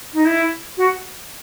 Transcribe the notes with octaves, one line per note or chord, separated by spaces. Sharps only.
D#4
E4
F#4